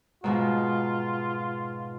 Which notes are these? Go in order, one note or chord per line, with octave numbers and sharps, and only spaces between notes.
G#2 B2 G#3 F4